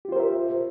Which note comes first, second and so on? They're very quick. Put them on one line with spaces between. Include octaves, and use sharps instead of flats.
G4 F4 C5 A#4 E5